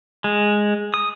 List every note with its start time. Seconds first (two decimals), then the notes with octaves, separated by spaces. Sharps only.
0.24 G#3
0.94 D#6